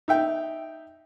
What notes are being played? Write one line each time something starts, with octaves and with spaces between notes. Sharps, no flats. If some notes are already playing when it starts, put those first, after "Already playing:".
D#4 E5 G5